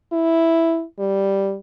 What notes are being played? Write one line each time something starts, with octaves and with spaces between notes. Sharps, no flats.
E4
G3